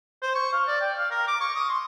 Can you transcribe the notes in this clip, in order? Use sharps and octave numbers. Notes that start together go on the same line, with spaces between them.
C5
C#6
F5
D5
G5
F5
A#4
D6
C#6
D#6
C6